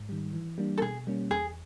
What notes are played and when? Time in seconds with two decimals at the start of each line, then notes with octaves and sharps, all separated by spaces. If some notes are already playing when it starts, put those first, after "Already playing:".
Already playing: G#2
0.09 D#3 G3
0.33 E3
0.58 G3 A#3 D4
0.78 A4
0.82 B2 G#4
1.07 G3 A#3 C#4
1.31 E2 G#4